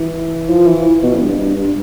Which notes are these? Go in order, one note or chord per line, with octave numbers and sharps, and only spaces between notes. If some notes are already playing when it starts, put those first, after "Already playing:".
Already playing: E3
F3
E3
B2
F2
G2
G2
G2